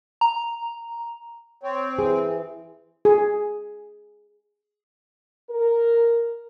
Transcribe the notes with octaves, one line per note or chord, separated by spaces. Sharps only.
A#5
C4 C#5
E3 G#4
G#4
A#4